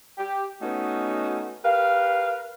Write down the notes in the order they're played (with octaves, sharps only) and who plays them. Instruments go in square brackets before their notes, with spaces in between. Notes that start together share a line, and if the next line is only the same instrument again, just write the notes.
[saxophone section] G4
A3 B3 C#4 D#4 F#4
G4 A#4 B4 F5